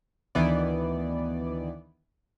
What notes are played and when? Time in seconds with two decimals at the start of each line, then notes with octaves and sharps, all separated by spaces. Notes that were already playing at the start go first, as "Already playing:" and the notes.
0.35 D2 D#3 E3 B3 D5